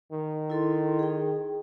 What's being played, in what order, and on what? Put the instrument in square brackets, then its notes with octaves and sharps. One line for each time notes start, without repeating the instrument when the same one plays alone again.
[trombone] D#3
[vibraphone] E4 A4 C6
G#4 G5